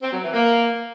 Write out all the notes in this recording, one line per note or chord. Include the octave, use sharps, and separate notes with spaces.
C4
F#3
E3
A#3